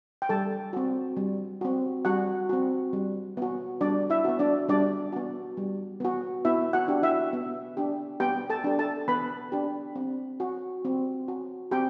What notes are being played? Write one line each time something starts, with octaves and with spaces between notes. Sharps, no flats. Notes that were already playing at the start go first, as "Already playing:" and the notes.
G5
G3 A4 A5
C4 F#4
G3
C4 F#4
G3 F#4 F#5
C4 F#4
G3
B3 F#4
G3 D4 D5
E4 E5
B3 F#4
D4 D5
G3 D4 D5
B3 F#4
G3
B3 F#4
B3 E4 E5
F#4 F#5
D4 G4
E4 E5
B3
D4 G4
B3 G4 G5
A4 A5
D4 G4
A4 A5
B3 B4 B5
D4 G4
C4
F#4
C4
F#4
C4 G4 G5